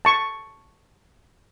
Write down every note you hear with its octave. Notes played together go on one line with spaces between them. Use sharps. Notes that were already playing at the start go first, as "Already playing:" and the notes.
A5 C#6